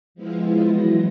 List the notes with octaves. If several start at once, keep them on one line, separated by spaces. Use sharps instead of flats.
F3 G#3 B3 E4 F4
E3 F#3 A#6